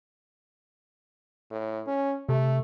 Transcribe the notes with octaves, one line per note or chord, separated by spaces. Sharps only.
A2
C#4
C3 A3